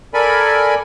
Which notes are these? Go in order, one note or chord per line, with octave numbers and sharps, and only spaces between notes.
A4 A#4 D5 G#5 B5